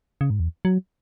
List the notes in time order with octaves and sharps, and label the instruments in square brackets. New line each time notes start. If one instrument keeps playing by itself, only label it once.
[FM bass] C#3
G#2
E2
F#3